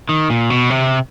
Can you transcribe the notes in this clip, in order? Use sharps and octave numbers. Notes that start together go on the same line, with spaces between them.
D#3
A#2
B2
C3